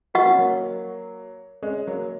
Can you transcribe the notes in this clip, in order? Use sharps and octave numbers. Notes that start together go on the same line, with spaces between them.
A#3 F#4 D#5 F#5 C#6
C#4
F#3 A#3
G#3 C#4
F#3 A#3